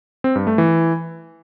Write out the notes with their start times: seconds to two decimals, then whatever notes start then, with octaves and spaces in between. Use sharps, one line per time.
0.24 C4
0.36 G2
0.47 A3
0.58 E3